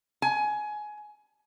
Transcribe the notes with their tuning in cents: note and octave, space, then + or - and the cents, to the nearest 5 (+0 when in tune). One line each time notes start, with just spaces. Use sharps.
G#5 +20